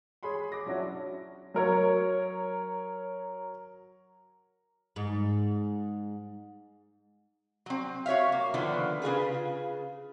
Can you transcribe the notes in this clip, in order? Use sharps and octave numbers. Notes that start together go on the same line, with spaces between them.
G#4 C#5 B5 C6
D6 A#6
F#3 C#4 D4 E4 F#4
F#3 A#4 C#5
G#2
F#3 C4
F#4 C#5 E5 F5
A#3
D3 D#3 F3 A#3 B3 D4
C#3 F4 G#4 B4